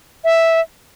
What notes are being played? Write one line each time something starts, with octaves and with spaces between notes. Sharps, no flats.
E5